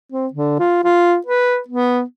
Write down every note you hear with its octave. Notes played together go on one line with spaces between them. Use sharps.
C4
D3
F4
F4
B4
B3